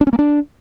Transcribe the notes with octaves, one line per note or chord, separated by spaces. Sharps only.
D4
C#4
A#3
D4